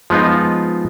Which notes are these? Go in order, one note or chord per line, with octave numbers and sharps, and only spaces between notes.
F3 G#3 B3 D#4 F4